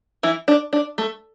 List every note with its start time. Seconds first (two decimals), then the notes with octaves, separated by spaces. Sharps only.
0.23 E3 E4
0.48 D4
0.73 D4
0.98 A3